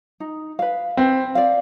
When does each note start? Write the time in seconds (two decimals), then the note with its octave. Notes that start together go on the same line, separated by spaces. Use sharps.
0.20 D#4
0.59 B4 F5
0.97 C4 B4
1.35 D5 F5